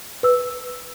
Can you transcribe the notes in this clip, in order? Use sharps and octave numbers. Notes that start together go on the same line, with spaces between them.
B4 E6